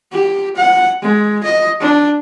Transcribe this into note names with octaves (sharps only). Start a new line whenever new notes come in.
G4
F#5
G#3
D#5
D4